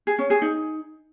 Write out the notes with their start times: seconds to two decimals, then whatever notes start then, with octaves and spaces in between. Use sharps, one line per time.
0.07 G#4
0.19 C#4
0.30 G#4
0.42 D#4